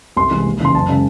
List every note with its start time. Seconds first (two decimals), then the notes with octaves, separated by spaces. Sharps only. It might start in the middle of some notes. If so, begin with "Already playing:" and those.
0.17 C2 C6
0.31 C3 E3 G#3
0.45 D#2
0.60 C#3 E3 C6
0.74 F#1 A5
0.89 C#3 G#3